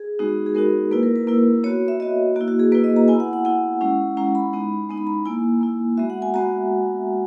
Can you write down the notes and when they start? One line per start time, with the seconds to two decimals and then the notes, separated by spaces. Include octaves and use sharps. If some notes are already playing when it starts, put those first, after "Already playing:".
Already playing: G#4
0.19 G#3 B3 D#4 F#4
0.46 G#4
0.55 G#3 B3 D#4 F#4 A#4
0.91 A#3 E4 B4
1.03 A#4
1.16 B4
1.27 A#3 E4
1.64 B3 F#4 C#5
1.88 E5
2.00 B3 F#4 D#5
2.36 A#3 E4 F#4
2.48 F#4
2.60 G#4
2.72 A#3 E4 B4
2.84 D#5
2.96 A#5
3.08 B3 E4 G#5
3.20 F#5
3.33 F#5
3.45 B3 E4 F#5
3.81 G#3 C#4 E4
4.17 G#3 C#4 E4 A#5
4.35 B5
4.53 G#3 B3 D#4
4.89 G#3 B3 D#4
4.98 B5
5.07 A#5
5.25 A#3 E4 G#5
5.61 A#3 E4
5.97 G#3 B3 F#4 E5
6.10 F#5
6.22 G#5
6.34 G#3 B3 F#4 A#5